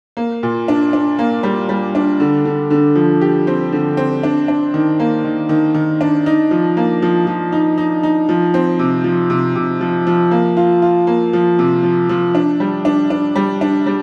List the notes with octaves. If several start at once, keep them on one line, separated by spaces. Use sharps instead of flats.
A#3
A#2
D4
D4
A#3
G3
G3
D4
D3
D3
D3
F3
G4
C4
D3
C4
D4
D4
D#3
A#3
D#3
D#3
D#3
D4
D#4
F3
A#3
F3
F3
D#4
D#4
D#4
F3
C4
C3
F3
C3
C3
F3
F3
A#3
F4
F4
A#3
F3
C3
F3
F3
D4
G3
D4
D4
G3
D4
G3